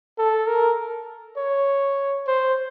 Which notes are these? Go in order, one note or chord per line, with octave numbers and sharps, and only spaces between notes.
A4
A#4
C#5
C5